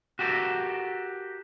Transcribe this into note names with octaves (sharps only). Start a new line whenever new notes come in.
F#4 G4 A4 A#4